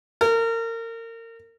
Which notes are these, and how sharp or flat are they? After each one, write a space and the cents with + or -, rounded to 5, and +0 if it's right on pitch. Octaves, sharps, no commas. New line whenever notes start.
A#4 -30